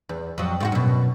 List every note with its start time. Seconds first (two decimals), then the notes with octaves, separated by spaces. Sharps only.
0.09 E2
0.38 F2 F#3
0.60 G#2 F4 F#4
0.72 F#2 B2